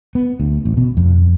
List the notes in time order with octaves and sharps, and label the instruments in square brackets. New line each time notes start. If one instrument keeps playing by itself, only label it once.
[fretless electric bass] B3
D2
A1
B2
F2